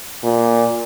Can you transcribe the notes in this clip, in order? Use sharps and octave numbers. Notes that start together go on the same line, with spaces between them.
A#2